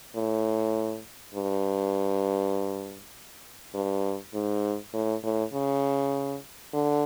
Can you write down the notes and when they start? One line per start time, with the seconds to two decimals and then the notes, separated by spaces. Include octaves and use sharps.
0.15 A2
1.35 G2
3.74 G2
4.34 G#2
4.94 A2
5.23 A2
5.53 C#3
6.73 D3